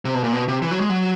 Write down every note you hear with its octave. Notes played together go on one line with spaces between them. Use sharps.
C3
B2
A#2
B2
C3
E3
F#3
G#3
F#3